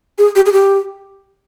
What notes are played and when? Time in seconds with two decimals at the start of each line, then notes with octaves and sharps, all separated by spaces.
0.18 G#4
0.35 G4
0.46 G#4
0.52 G4